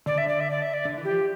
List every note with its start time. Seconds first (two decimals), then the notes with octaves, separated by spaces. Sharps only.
0.06 D3 D5
0.18 E5
0.28 D5
0.40 E5
0.51 D5
0.62 E5
0.74 D5
0.85 D3
0.98 E3
1.04 G4
1.11 F3